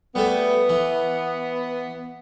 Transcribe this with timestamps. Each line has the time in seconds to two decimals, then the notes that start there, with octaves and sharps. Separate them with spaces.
0.15 G3 A3 B3 A4
0.69 E3